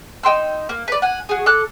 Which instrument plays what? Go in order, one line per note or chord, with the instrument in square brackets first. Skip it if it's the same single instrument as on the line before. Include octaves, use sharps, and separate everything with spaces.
[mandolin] D#4 G5 C6 E6
A#3
B4 D5
F#5 G#5
F#4 G#4
A4 D6 F#6